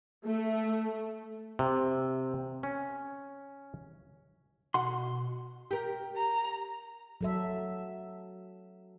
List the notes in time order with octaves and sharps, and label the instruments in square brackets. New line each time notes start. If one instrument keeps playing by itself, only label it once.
[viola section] A3
[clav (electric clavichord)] C3
C#4
[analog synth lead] B2 [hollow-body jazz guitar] F#5 C6
[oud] G4 A#4
[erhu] A#5
[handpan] F#3 A4 E5